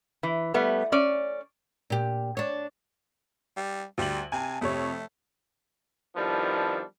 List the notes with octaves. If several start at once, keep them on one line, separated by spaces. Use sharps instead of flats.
E3
G3 A3 B3
C#4 D5
A#2 G4
D4 C#5
G3
D2 G3 F#7
C3 G#5 A5
F2 C3 A3 C#5
D#3 F3 G3 B3 D4 E4